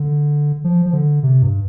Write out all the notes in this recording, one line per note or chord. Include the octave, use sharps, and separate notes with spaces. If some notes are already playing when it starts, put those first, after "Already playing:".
Already playing: D3
F3
F3
D3
C3
G2